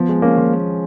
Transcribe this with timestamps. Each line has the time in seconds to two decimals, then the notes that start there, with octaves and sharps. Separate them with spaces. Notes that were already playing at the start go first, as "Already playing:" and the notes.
Already playing: F3 B3
0.09 G#3
0.22 A#3 C#4
0.37 F3